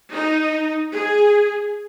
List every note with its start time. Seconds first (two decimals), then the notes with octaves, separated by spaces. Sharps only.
0.14 D#4
0.92 G#4